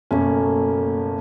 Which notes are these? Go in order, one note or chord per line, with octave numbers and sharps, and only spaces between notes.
F#1 B1 F#2 A3 A#3 C#4